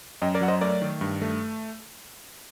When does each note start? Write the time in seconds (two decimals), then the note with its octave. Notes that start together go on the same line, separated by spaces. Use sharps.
0.22 F#2 D#5 G5
0.35 A#4 D5
0.41 F#3 F#5
0.48 C5 D#5
0.61 A3 A#4 D5
0.82 D#3
1.01 G2
1.22 A3